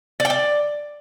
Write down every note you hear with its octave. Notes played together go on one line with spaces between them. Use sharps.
D5
G5
D5